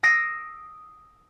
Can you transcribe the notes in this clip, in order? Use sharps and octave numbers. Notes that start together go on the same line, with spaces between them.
D#6 E6 A#6 C7 D7